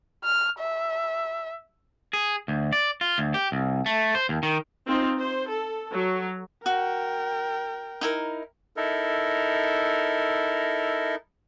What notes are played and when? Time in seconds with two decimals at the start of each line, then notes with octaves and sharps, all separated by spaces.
0.24 F6
0.60 E5
2.13 G#4
2.48 D2
2.73 D5
3.01 F4
3.18 D2
3.34 G4
3.52 C2
3.86 A3
4.15 C5
4.29 D#2
4.43 D#3
4.86 C4 D#4 F4 C5
5.17 C5
5.47 A4
5.92 F#3
6.66 F#4 A#4 G5
8.01 D#4 E4 A#4
8.77 D#4 E4 A4 A#4